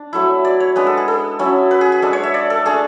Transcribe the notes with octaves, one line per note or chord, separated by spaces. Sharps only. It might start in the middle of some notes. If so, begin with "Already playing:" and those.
Already playing: D4
F#3 A3 E4
D5
C#5
G#3 B3 D4 B4
A4
G#4
A4
F#3 C#4 E4
B4
G#4
G#4
G#3 D4 A4
C#5
E5
D5
A4
A3 D4 G#4